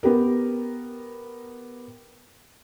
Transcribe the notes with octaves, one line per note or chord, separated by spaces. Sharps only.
B3 G4 A#4